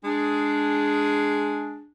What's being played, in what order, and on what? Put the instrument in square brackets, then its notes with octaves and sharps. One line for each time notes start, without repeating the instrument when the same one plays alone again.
[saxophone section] G#3 G#4 [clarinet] D4